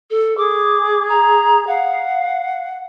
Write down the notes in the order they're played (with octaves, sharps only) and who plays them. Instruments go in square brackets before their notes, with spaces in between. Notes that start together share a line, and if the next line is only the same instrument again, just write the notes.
[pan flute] A4
[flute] G#4 [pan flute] D6
[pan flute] A#5
[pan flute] F5 [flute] F#5